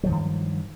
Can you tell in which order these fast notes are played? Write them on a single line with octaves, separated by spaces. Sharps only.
F#3 F3 D#3 G2